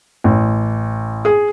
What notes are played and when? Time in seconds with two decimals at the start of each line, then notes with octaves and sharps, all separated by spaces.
0.24 A1
1.25 G#4